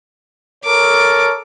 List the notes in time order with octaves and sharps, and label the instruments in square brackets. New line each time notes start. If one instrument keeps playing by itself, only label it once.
[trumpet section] A4 A#4 C#5 [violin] D6